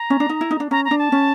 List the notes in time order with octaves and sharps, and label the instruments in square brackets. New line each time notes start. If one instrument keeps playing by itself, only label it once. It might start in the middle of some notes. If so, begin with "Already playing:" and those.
Already playing: [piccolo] A#5
[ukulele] C#4
D4
D#4
E4
D#4
D4
[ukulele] C#4 [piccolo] A#5
[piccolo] A#5
[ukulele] D4
[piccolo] A5
[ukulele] C#4